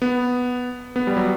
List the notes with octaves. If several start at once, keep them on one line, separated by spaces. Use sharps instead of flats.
B3
B3
G3
F#3